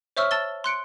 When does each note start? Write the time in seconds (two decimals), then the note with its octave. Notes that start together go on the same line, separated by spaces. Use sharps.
0.17 C5 C#5 E5 C#6 E6 F6
0.31 A5 E6 A6 G7
0.64 C6 F#6 C#7 D7